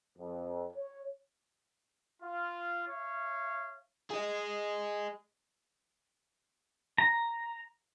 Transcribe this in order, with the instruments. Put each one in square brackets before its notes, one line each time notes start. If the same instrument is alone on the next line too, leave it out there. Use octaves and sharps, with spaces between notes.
[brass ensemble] F2
C#5
[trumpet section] F4
C#5 E5 F5
[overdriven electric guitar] G#4 D#5
[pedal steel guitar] A#5